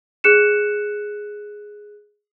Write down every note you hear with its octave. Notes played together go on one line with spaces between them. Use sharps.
G#4 F#6 C#7 E7